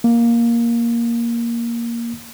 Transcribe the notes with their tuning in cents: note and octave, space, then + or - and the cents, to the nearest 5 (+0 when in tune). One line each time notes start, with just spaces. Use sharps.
A#3 +5